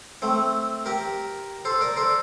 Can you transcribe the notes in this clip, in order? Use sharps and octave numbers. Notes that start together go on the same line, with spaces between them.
A3 C4
G4 A#4
A4 C5
A#4 D5
A4 C5